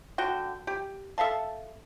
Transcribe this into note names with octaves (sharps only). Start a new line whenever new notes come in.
D3 F#4 G5
G4
A4 E5 F5 A5